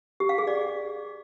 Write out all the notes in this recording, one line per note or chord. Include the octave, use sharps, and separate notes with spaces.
G4
F5
G#4
D5